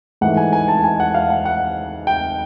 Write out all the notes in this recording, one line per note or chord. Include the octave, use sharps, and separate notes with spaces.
G#2 E3 A3 F#5
G#5
G#5
A5
G#5
F#5
F5
F#5
F#5
G5